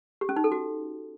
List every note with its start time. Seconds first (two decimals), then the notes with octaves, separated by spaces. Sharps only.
0.21 G4
0.29 C#4
0.36 D#4
0.44 A4
0.52 F#4